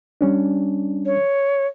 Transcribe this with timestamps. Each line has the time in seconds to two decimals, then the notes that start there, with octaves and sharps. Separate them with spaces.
0.21 G3 C#4 D4
1.06 C#5